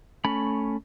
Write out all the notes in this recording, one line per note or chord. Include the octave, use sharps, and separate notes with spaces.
A3 C#4 B5